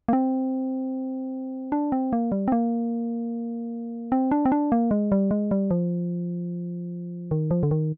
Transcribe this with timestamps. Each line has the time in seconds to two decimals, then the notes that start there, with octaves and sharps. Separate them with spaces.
0.08 A#3
0.13 C4
1.72 D4
1.92 C4
2.13 A#3
2.32 G3
2.48 C4
2.52 A#3
4.12 C4
4.31 D4
4.45 C4
4.52 D4
4.72 A#3
4.91 G#3
5.12 G3
5.31 G#3
5.51 G3
5.71 F3
7.31 D#3
7.51 F3
7.63 D3
7.71 D#3